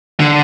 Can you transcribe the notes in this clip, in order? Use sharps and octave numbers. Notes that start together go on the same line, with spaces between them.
D3